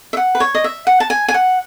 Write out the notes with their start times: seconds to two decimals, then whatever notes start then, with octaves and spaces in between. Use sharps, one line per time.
0.13 E5
0.17 F#5
0.35 B4
0.40 C#5
0.55 D#5
0.64 E5
0.87 F#5
1.00 A5
1.10 G#5
1.28 G#5
1.34 F#5